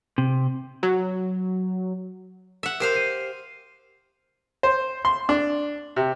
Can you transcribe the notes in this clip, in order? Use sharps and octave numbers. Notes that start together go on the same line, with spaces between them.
C3
F#3
E5 F#5
G4 A#4 C5 F5
C7 D#7
C5
C6
D4
C3